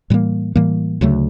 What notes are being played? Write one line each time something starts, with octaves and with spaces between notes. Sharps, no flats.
A2 E3 G3 A#3
A2 E3 G3 A#3
D2 C#3 F#3 A3